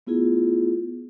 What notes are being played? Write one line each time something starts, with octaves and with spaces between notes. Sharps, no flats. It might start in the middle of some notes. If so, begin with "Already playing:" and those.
A3 B3 E4 F4 G#4